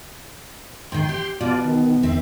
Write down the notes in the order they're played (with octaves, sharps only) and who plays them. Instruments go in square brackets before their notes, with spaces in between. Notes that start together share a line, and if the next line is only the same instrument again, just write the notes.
[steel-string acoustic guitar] G#2 D#3 [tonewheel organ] G5 C6
[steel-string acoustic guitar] G4
[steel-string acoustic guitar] B2 [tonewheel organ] F4 D5
[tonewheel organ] D#3
[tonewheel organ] E2 D#3 E5 [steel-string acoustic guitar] C4